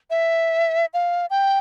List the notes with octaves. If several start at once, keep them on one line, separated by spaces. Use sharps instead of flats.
E5
F5
G5